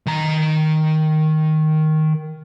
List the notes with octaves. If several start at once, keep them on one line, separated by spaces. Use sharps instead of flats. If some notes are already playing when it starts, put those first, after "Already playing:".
D#3 A#5